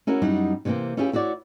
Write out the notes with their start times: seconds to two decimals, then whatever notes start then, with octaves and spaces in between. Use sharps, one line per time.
0.07 C#4 E4 F#4 A#4
0.22 F#2 G3 D#4 E4 F#5
0.65 C3 E3 G3 A#3 C4
0.97 C#4 E4 F4 G4 G#4
1.13 E4 F#4 C#5 D5